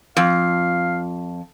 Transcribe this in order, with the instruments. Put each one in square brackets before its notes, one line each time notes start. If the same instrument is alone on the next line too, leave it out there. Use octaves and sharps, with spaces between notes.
[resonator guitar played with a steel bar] F2 [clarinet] F5